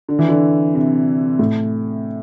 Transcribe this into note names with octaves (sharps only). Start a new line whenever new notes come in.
D3
E3
D3
C3
A2